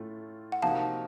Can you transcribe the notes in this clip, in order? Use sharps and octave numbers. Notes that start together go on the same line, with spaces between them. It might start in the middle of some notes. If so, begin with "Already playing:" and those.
Already playing: A2 A3 C#4 F4
F#5
C3 F3 A#3 D#4 F#4 F5 A5